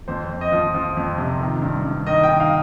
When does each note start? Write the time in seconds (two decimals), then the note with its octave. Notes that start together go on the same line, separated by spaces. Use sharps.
0.08 F2 C5
0.30 F2
0.41 D#5
0.52 F3
0.74 F3
0.97 F2
1.18 C3
1.41 D#3
1.62 G2
1.84 G2
2.07 D#3 D#5
2.23 G5
2.29 D#3
2.40 F5